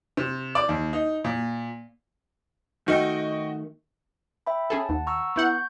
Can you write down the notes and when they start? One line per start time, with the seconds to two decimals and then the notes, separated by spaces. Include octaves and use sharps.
0.17 C3
0.55 D5
0.69 D#2
0.93 D#4
1.24 A#2
2.88 D#3 A3 F#4 D#5 G5
4.46 E5 G5 B5
4.70 C#4 G#4 A4 A5
4.89 D#2 F#5
5.07 A#5 C#6 E6
5.36 B3 E4 F#5 C#6 G6